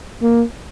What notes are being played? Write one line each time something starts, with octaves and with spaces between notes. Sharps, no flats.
A#3